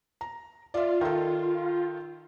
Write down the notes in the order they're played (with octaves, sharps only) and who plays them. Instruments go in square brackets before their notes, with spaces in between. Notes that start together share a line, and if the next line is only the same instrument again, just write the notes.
[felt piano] A#5
[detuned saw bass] F4 [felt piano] D5 E5
[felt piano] D#3 A4